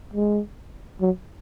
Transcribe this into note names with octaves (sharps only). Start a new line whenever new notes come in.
G#3
F#3